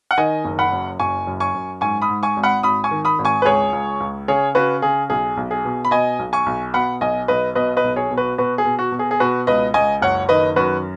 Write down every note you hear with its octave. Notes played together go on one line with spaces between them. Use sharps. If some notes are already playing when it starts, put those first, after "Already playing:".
F#5
D#3 D#5 G#5
F#1
F#5 B5
F#2
F#1 G#5 C#6
F#2
G#5 C#6
F#2
G#2 G#5 C#6
B5 D#6
G#2
G#5 C#6
G#1
F#5 B5
G#1 B5 D#6
G#5 C#6
D#3
B5 D#6
G#1
G#5 C#6
B4
C#2 G#4 C#5
C#2
C#2
C#3 G#4 C#5
C#3 F#4 B4
C#3 G#4
B1 G#4
B1
G#4
B2
B5
B2 D#5 G#5
B1
G#5 C#6
B1
B2 F#5 B5
B1 D#5 G#5
B1 B4 D#5
B2 B4 D#5
B4 D#5
B1
G#4 C#5
B2
F#4 B4
B2 F#4 B4
G#4
B2
F#4
B2
G#4
G#4
B2 F#4 B4
C#2 B4 D#5
C#2 D#5 G#5
F#1 C#5 F#5
D#3 B4 D#5
F#2 F#4 B4